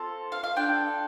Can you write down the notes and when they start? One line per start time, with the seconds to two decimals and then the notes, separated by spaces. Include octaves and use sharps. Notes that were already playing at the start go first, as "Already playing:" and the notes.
Already playing: C4 F4 A4
0.32 F5
0.44 F5
0.56 D4 F4 A4 G5